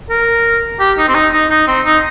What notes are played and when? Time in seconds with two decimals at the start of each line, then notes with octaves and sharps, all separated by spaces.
0.10 A#4
0.80 G4
0.98 D#4
1.09 C4
1.15 D#4
1.33 D#4
1.50 D#4
1.68 C4
1.85 D#4